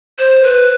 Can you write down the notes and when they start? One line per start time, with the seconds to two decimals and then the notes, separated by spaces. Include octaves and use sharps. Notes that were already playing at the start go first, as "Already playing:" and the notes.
0.19 C5
0.43 B4